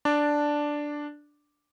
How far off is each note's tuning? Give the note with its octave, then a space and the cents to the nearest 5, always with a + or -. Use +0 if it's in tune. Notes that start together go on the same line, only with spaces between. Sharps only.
D4 +0 D5 +0